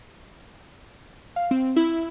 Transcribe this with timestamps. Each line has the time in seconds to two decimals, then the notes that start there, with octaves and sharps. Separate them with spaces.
1.36 F5
1.51 C4
1.76 E4